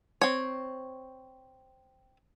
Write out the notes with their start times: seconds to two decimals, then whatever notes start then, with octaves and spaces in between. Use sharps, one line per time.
0.21 C4 C#5